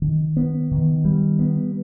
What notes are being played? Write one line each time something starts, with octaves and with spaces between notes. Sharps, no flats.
D#3
B3
D#3
G3
B3